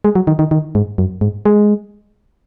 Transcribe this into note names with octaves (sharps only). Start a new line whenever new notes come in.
G#3
F#3
D#3
D#3
D#3
G#2
F#2
G#2
G#3